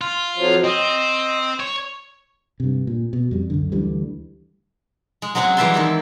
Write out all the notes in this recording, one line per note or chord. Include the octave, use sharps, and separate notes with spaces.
F4
F2 F3 F#3
C4 D#5
C#5
G2 C3
A#2
B2
F2 G3
C#2 F#2 D3
D2 D3 E3 G3
G#3
F#3 G#3 C4 C#4 F#4
E3 G3 C5 E5 A5 C6
D#3 E3 G#3